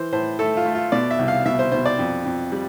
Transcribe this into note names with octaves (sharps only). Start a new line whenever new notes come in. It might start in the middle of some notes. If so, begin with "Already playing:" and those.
Already playing: E3 C5
A2 C5
A3 A4
F4
A3
F4
B2 D5
E5
C2
F5
B2 E5
C5
B2 C5
D5
F2
F2
G3